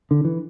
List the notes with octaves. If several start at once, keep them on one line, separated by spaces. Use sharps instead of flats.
D3
E3